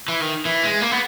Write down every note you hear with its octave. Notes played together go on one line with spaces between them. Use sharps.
E3
D#3
E3
G#3
A#3
B3